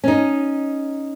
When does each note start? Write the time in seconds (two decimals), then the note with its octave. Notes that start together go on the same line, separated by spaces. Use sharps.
0.04 C#4 D#4